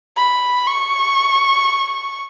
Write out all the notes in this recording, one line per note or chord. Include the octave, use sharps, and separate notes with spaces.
B5
C#6